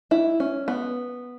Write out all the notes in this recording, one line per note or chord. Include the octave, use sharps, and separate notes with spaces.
E4
C#4
B3